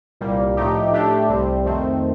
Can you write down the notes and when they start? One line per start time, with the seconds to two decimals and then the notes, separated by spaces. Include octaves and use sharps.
0.21 C2 A#2 G3 A#3
0.57 A2 F3 A3 D#4 G4
0.93 A2 A3 D4 G4
1.29 C2 C3 G3 C4
1.65 F2 D#3 A3 C4